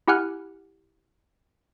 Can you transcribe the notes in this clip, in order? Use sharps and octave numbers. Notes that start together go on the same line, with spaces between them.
E4 G4 F#5 G#5 F6 F#6